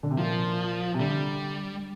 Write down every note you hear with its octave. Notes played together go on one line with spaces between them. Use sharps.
D3
C3
A#2 F3
C3
D3 G3